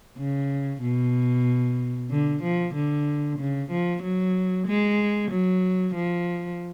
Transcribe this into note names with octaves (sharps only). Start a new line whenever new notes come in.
C#3
B2
D3
F3
D3
C#3
F3
F#3
G#3
F#3
F3